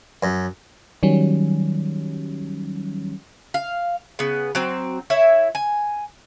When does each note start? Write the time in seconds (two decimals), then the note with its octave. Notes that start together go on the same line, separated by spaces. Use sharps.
0.23 F#2
1.03 D#3 F#3 G3 C#4
3.54 F5
4.19 C#3 B3
4.55 F#3 C4
5.10 E4 C#5 E5
5.55 G#5